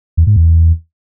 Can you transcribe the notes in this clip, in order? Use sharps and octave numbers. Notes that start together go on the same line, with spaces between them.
E2
G#2
E2